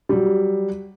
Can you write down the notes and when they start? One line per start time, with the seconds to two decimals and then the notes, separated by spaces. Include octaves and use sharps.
0.09 F#3 G3